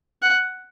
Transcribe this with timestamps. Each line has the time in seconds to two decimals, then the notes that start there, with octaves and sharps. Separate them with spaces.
0.22 F#5